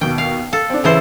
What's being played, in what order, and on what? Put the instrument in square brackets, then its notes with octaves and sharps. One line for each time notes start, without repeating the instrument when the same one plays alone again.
[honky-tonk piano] D#2 B2 [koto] G5
[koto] F5
[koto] A4 [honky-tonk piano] F5
[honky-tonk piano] C4 D4
[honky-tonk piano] A1 E6 A6 [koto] C#3 E3 C5